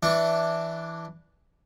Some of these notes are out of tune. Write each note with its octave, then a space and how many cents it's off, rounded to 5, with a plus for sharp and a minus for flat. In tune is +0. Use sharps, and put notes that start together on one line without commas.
E3 +0 D4 +0 C#6 +0